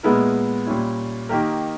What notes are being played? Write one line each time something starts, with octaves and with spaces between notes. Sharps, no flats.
A#2 G#3 B3 E4 A#4
A#2 G3 C#4 E4
D#3 A#3 D#4 G4 A#4